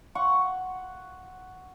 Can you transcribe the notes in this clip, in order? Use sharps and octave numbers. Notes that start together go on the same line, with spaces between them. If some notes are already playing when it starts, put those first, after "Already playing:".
F#5 C#6